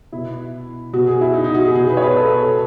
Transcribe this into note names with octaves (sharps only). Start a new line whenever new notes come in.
B2 E4
B2 F#4
G#4
E4
D#4
D#4
F#4
G#4
B2 G#4
B4
C#5
B4
A4
A4